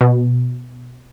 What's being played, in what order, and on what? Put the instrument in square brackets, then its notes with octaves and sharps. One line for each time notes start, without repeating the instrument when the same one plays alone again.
[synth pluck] B2